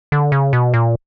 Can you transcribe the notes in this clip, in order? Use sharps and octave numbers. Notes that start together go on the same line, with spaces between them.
D3
C#3
B2
A#2